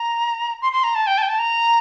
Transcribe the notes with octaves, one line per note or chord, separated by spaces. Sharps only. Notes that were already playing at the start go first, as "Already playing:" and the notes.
Already playing: A#5
C6
C6
A#5
A5
G5
A5
G5
A5
A#5